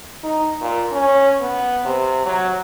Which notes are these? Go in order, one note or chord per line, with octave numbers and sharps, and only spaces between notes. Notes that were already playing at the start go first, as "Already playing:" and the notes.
D#4
A#2
C#4
B3
C3
F#3